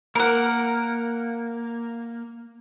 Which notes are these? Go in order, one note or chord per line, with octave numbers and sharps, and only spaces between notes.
A#3 A#4 F#5